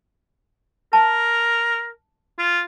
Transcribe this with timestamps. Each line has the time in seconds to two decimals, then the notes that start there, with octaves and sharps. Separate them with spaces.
0.93 A#4 A5
2.39 F4